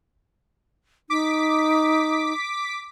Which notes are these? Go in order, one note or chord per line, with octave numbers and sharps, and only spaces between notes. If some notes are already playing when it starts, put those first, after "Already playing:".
D#4 D6 B6